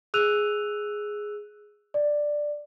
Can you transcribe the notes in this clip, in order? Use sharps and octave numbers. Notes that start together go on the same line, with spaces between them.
G#4 E6 F#6 D#7 F7
D5